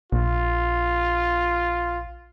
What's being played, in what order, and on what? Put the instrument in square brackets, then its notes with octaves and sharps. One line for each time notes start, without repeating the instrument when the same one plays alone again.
[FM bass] A#1 [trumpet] F4